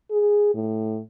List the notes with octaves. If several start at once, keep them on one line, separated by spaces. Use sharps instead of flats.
G#4
A2